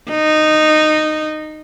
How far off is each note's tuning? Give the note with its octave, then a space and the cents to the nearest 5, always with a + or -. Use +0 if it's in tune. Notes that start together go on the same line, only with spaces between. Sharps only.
D#4 -15